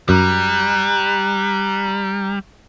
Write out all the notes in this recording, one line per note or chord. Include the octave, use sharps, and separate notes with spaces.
F#2 G3 A#5 F#6